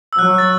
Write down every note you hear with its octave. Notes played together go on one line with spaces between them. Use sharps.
E6
F#3 F#6
A6